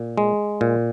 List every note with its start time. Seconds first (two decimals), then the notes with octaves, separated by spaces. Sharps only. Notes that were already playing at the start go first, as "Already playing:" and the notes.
Already playing: A#2
0.18 G#3
0.61 A#2